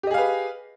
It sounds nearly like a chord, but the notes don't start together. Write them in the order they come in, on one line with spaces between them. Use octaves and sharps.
G4 D#5 G#4 F5 B4